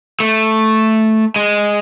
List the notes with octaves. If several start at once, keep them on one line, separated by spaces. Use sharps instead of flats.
A3
G#3